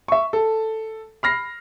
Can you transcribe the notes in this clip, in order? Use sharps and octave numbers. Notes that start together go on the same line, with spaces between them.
E5 C#6
A4
B5 F6 A#6 C7